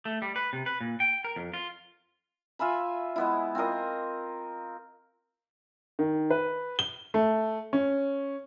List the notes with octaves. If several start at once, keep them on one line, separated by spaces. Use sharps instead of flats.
A3
G3
B4
C3
B4
A#2
G5
A#4
F2
F4
F4 E5 G#5 B5
G#3 B3 E4
C4 F4 A#4 D#5
D#3
B4
G7
A3
C#4